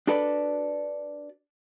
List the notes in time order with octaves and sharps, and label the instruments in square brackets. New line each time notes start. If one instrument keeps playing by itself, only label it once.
[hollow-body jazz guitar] D4 F#4 A4 B4 D5